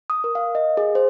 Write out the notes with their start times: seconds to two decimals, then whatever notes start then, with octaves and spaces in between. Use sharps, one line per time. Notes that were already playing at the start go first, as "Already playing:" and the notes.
0.10 D#6
0.24 A#4
0.35 F5
0.55 D#5
0.77 G#4
0.95 C5